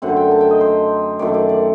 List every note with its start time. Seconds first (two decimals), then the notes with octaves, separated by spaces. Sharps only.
0.02 F#2 D3 A3 C4 F#5
0.17 G5
0.31 A5
0.41 G5
0.51 D#5
0.61 C5
1.19 F#2 D#3 A3 C4 D5
1.34 D5
1.49 D5